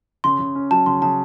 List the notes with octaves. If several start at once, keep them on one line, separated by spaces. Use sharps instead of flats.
C#3 C6
C#3
C#4
F#3 A5
C#3 C6
C#3 A5